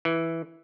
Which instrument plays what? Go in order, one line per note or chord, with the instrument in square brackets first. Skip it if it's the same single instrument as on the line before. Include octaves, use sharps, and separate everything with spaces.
[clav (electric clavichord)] E3